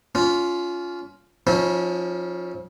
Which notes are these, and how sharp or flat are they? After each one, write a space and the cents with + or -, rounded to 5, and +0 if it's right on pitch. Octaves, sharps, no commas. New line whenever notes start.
C#4 +30 F4 +0
F3 +20 C#4 +0 E4 -40